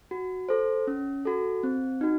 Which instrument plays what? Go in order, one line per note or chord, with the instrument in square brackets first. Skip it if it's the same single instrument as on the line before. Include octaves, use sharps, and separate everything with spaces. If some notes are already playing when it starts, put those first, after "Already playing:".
[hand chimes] F#4
A4 C5
C#4
F#4 A4
C4
D#4 F#4